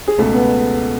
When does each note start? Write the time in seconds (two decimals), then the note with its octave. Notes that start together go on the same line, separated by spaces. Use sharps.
0.08 G#4
0.18 C#2 B2 G#3 A3 A4
0.33 B3 B4